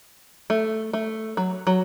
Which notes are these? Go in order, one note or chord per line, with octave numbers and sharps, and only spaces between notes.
A3
A3
F#3
F#3